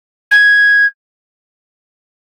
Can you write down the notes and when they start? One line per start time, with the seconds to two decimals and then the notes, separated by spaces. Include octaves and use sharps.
0.31 G#6